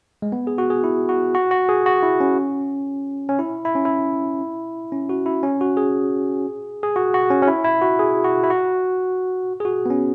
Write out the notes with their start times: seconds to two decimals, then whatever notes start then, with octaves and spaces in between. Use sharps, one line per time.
0.22 G#3
0.32 B3
0.47 G#4
0.58 F#4
0.70 G#4
0.84 E4
1.09 F#4
1.35 F#4
1.51 F#4
1.69 G#4
1.86 F#4
2.03 E4
2.20 C#4
3.29 C#4
3.39 E4
3.65 E4
3.75 C#4
3.85 E4
4.92 C#4
5.09 F#4
5.26 E4
5.43 C#4
5.61 F#4
5.77 G#4
6.83 G#4
6.96 F#4
7.14 F#4
7.30 C#4
7.42 C#4
7.48 E4
7.64 E4
7.81 F#4
7.99 G#4
8.24 F#4
8.44 E4
8.50 F#4
9.60 G#4
9.65 F#4
9.86 B3
9.90 C#4